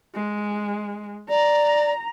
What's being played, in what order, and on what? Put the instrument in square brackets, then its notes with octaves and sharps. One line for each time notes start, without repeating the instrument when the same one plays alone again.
[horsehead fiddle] G#3
[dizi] D5 [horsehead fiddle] A#5